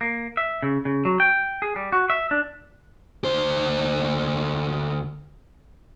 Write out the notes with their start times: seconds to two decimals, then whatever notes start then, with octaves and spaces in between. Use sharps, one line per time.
0.01 A#3
0.37 E5
0.63 C#3
0.85 C#3
1.05 F#3
1.20 G5
1.62 G#4
1.76 G3
1.92 F#4
2.10 E5
2.31 D4
3.24 D2 C5